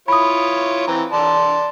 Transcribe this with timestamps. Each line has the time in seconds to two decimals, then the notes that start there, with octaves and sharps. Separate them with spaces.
0.08 E4 F4 C#5 B5 D#6
0.87 E3 C4 A#5
1.13 D5 A5 C6